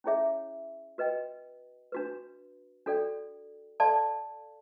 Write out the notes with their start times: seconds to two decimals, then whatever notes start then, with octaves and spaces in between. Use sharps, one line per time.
0.04 C#4 E4 G#4 C#5 E5
0.98 F#4 B4 D#5 G5
1.92 D4 F#4 B4
2.86 D4 F#4 A4 D5 G5
3.80 A4 D5 F5 A5 C6